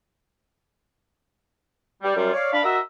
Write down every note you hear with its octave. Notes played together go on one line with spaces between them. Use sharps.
G3
F#2 G3 F4
C#5 D5 F5
D4 F5 B5
F#4 A#4 D#5 E5